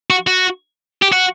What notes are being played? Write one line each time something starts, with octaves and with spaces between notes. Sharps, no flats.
F#4
F#4
G4
F#4